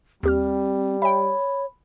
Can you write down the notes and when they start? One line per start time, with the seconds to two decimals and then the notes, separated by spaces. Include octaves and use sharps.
0.23 D#2 G3 C4 G4 F6
1.02 C#5 E5 G5 B5